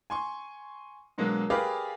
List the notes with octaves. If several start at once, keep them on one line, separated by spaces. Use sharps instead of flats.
G#5 C6 C#6
B2 D3 F#3 G#3 A#3
G4 G#4 A#4 B4 D5 F5